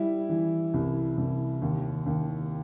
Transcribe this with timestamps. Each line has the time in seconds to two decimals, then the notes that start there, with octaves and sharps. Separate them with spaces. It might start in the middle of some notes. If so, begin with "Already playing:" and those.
Already playing: G3 E4
0.29 E3
0.74 C2
1.17 C2
1.62 D#2
2.06 D#2